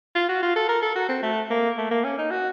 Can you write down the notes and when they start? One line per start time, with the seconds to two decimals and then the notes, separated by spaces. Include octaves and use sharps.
0.15 F4
0.29 F#4
0.42 F4
0.56 A4
0.69 A#4
0.83 A4
0.96 F#4
1.09 C4
1.23 A3
1.50 A#3
1.78 A3
1.91 A#3
2.04 C#4
2.18 D#4
2.31 F#4